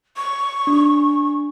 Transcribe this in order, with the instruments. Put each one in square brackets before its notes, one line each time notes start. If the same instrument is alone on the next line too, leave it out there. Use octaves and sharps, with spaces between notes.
[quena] C#6
[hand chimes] D4